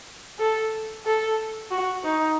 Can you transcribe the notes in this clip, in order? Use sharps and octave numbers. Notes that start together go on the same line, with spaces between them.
A4
A4
F#4
D#4